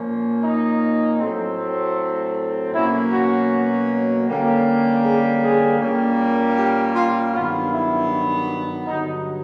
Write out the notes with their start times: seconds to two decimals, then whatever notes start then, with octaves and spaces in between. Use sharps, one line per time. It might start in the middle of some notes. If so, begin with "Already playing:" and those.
Already playing: A#2 F3 A#3 C#4
0.44 D#4
1.20 A2 F#3 A3 C4
2.73 B2 F#3 A#3 C#4 E4
3.12 F#4
4.27 D3 G3 A#3 C#4
5.04 G#4
5.42 G#4
5.80 A#2 G3 A#3 C#4
6.57 G4
6.95 F4
7.34 G2 D#3 F#3 B3 F4
7.72 E4
8.87 G2 D3 F#3 D#4